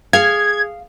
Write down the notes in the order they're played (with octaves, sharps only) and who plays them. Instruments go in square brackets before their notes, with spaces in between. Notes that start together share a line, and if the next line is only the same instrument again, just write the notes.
[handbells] G#4 [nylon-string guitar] F5 [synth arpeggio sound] G#6